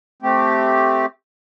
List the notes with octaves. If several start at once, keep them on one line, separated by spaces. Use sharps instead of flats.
A3 C4 G4